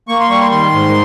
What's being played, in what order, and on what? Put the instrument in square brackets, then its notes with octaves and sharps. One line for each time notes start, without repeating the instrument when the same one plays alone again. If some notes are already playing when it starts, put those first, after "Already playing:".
[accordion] A#3 C#6
C6
G3 C#6
C6
D#3 C6
G#2